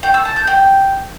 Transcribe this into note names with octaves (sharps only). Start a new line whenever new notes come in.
G5
E6
A5
G6
G5